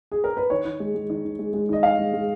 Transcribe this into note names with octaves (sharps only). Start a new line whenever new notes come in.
G#4
A#4
B4
D#3 C#5
D#3
G#3
G#3
D#3
D#3
G#3
G#3
D#3 D#5
D#3 F5
G#3
G#3